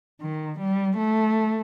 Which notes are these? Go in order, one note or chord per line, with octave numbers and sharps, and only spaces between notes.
D#3
G3
A3